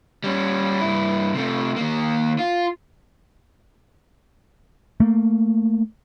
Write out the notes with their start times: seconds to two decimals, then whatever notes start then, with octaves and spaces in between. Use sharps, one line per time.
0.24 G3 C#4
0.80 G2 E4
1.34 C3 A3
1.76 D#3 A#3
2.39 F4
5.00 A3 A#3